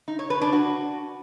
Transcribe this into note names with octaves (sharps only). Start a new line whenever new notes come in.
D#4
C#5
B4
D4
F#4